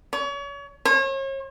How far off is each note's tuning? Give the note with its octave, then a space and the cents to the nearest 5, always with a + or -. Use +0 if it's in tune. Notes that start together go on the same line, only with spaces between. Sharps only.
C#5 +35
C#5 -40